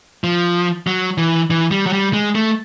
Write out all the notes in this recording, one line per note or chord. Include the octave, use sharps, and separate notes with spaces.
F3
F#3
E3
E3
G3
F#3
G3
G#3
A3